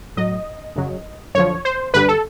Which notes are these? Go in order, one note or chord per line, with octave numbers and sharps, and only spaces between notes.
A2 F#3 D#5
F#2 C#3 F#3
F#2 D3 F3 C#5
C5
G2 D3 G3 B4
A4